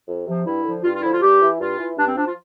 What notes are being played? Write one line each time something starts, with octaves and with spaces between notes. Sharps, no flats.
F2
C3 F3
G2 E4
D3 F3
G2 F4
F4
D3 F3 E4
F4
G2 G4
E3
G2 F4
E3
G2 D4
C4
F3 D4
F4